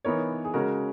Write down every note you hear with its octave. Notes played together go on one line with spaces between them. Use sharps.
E3 B3 D#4 A#4 C#5
G#4
C#3 G#3 C#4 F#4 A#4